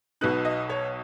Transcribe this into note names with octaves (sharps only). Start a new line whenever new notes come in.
B1 B2 B3 D#4 F#6
D#5
C#5